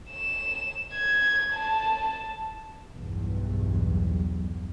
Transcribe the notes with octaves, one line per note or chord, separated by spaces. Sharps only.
E7
G#6
A5
B1 E2 G2